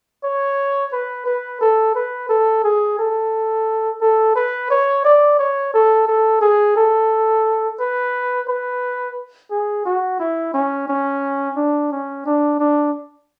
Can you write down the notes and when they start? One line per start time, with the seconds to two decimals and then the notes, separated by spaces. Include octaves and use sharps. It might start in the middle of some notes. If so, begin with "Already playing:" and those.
0.24 C#5
0.92 B4
1.26 B4
1.61 A4
1.95 B4
2.29 A4
2.64 G#4
2.99 A4
4.01 A4
4.36 B4
4.70 C#5
5.05 D5
5.39 C#5
5.74 A4
6.07 A4
6.41 G#4
6.77 A4
7.80 B4
8.48 B4
9.51 G#4
9.86 F#4
10.20 E4
10.54 C#4
10.88 C#4
11.56 D4
11.92 C#4
12.26 D4
12.60 D4